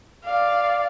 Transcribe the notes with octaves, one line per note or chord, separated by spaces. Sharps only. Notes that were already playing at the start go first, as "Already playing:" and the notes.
D5 F5